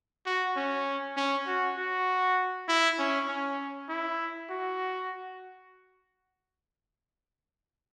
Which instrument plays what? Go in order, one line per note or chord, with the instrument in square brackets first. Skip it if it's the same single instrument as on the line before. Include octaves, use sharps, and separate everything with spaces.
[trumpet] F#4
C#4
C#4
F#4
F#4
E4
C#4
C#4
E4
F#4